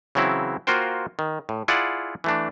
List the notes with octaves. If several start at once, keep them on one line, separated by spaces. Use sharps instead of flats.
C#3 E3 F#3 C4 E4
A#3 F4 F#4 A#4 C5 G5
D#3
A2
E4 F4 G#4 D5 F#5
E3 A3 D4